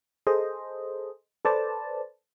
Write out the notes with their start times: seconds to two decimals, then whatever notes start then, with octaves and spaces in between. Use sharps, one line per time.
0.27 G#4 A4 C5 D#5
1.45 A4 B4 C5 D5 A5